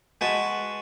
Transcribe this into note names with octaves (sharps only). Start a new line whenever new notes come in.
G#3 F#4 B4 A5